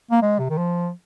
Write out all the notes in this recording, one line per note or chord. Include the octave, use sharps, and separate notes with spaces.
A#3
G#3
C3
D#3
F3